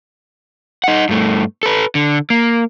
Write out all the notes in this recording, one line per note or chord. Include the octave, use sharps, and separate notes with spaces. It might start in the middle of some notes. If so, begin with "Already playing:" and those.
D#4 F#5
G2 A3
A4 B4
D3
A#3